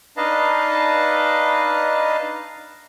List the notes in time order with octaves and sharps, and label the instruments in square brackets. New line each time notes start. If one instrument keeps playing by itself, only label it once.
[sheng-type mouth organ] D4 D#4 B4 D#5 F5 A5